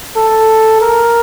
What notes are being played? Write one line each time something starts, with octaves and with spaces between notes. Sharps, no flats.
A4
A#4